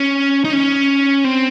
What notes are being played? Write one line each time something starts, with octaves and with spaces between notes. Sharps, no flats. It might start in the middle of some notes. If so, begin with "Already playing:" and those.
Already playing: C#4
D#4
C#4
C4